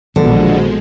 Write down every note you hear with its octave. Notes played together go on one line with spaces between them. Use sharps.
A#1 B2 D3 D#3 F3 F#3 G#3 A#3